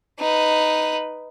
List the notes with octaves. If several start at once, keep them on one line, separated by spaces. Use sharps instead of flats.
D#4 B4